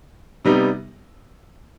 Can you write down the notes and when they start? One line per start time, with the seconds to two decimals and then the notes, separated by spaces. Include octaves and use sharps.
0.45 C3 G3 B3 D#4